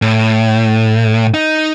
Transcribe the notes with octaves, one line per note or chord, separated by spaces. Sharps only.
A2
D#4